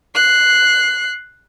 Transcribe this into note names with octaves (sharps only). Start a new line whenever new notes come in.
F#6 C7